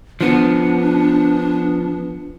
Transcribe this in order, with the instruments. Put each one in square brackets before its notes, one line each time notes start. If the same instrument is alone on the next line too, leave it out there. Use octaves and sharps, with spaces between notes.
[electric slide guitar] F3 B3 [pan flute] D4